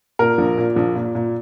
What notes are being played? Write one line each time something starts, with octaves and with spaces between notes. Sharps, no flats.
A#2 A#4
A#1
A#2
A#1
A#2
A#2